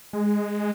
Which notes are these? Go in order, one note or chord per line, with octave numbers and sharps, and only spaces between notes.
G#3